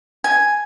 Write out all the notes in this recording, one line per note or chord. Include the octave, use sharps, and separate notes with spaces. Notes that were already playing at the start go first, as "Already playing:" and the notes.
G#5